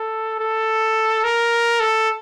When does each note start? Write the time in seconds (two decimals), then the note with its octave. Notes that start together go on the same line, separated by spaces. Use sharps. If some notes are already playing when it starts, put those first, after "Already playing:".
Already playing: A4
0.40 A4
1.24 A#4
1.80 A4